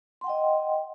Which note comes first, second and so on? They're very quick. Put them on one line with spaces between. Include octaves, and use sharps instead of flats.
C6 F#5 G5 D#5